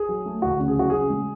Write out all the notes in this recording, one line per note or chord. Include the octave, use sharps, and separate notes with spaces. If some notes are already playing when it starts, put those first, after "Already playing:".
Already playing: G#4
F#3
A3
D2 F#4
C#3
G#4
F#3 F#4
C#3 G#4
G#3